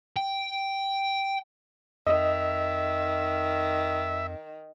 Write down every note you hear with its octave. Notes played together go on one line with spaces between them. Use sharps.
G5
F2 D#3 D#5 E5